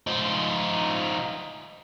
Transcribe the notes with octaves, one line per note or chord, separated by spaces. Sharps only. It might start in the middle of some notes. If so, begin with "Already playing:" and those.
F3 D#4